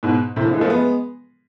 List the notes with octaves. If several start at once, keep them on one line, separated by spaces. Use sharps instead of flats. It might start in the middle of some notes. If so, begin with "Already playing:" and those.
G#2 B2
A2 C3
D3 F3
E3 G#3
F3 A3
G#3 B3